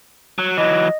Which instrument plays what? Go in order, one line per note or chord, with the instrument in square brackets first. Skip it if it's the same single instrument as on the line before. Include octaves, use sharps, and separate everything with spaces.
[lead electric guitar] F#3
[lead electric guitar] E3 F#3 [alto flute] D#5